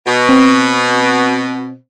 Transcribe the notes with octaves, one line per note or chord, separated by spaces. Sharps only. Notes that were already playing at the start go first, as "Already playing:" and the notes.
B2
C4